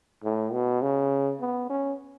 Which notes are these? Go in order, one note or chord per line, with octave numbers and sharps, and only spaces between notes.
A2
B2
C#3
B3
C#4